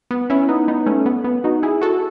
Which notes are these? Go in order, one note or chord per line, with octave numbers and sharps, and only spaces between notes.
B3
C#4 E4
B3 D#4
B3 D#4
A3 C#4
B3
B3
D#4 F#4
E4 G#4
F#4 A4